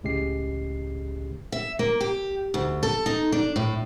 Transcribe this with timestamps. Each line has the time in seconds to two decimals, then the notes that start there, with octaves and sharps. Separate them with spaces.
0.03 C#2 A2 C#3 G#3 G4 C7
1.52 E5
1.79 A#3
2.01 G4
2.54 D2
2.83 A4
3.06 D#4
3.32 D4
3.56 A2